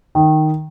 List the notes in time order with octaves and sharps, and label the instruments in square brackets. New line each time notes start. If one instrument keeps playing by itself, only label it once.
[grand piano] D#3